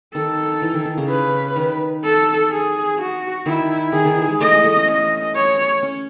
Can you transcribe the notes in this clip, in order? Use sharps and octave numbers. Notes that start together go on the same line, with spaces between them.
D#3 A4
E3
D#3
D#3
C#3
B4
D#3
A4
G#4
F#4
D#3 E4
D#3 G#4
D#3
E3
G#3
A3 D#5
G#3
A3
C#4
D#5
C#5
C#4